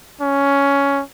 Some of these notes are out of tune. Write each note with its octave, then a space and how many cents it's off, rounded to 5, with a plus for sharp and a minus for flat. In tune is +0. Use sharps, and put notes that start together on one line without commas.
C#4 +10